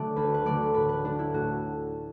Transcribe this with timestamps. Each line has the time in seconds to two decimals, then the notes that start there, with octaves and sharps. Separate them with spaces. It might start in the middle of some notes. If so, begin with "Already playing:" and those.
Already playing: D3 F#3 A3 D5 E5
0.16 D2 B4
0.34 B4
0.45 D3 F#3 A3 D5
0.74 A2 B4
0.89 B4
1.05 A3 D4
1.19 E4
1.33 A2 F#4